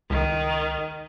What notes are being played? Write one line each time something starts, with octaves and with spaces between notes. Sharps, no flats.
C#2 D#3